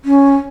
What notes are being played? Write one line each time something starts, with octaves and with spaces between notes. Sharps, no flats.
C#4